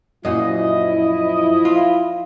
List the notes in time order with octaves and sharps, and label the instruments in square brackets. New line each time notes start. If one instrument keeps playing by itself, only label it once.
[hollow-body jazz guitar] F#2 A#2 [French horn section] F3 E4 [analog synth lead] D#5
[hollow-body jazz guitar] F4